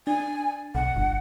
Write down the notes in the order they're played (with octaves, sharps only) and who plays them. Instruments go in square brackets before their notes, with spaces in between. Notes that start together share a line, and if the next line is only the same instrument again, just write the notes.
[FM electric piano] D4 [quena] G#5
[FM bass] B1 [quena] F#5
[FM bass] G1